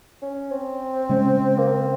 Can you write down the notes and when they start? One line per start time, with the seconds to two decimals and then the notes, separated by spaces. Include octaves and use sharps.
0.22 C#4
0.51 C4
1.09 C#3 G#3 C#4
1.58 A#3
1.68 C4